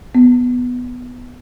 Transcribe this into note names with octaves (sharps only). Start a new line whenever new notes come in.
B3